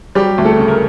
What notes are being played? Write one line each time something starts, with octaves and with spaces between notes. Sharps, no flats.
F#3 G3 G4
D2
A3 A4
C#3
A#4